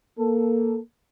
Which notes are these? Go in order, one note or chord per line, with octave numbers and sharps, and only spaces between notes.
A#3 A4